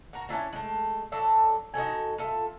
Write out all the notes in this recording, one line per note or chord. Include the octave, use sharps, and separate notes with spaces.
F#4 A#4
C#4 D4 E4 F4
G#3 A3
F#3 D4 A4 E5
D#4 F#4 A4 G#5
F4 A4 E5